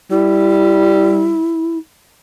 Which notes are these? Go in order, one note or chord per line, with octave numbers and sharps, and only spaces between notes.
G3 E4